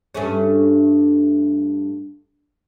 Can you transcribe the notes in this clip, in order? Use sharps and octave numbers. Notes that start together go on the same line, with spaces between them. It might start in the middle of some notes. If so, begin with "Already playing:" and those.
G2 A3 C#4